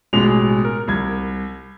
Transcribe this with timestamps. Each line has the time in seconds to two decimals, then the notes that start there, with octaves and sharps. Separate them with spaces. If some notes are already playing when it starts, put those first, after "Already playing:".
0.13 A1 B2 G#3 F7
0.64 A#4
0.88 C2 G#6